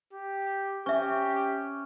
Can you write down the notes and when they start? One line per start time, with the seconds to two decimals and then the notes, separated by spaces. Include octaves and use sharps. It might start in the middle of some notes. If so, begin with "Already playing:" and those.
0.13 G4
0.86 C#4 G4 E5 C#6